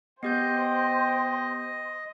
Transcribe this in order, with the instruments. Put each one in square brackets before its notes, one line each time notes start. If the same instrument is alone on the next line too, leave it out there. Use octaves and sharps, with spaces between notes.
[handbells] B3 G4 G6 [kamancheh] C5 [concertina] D#5 [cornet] G5